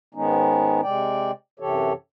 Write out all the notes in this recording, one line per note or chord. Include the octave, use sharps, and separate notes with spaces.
G#2 D#3 G#3 B3 C#4 D#4
C3 G#3 D5 G5
F#2 C3 E3 G4 A4 C#5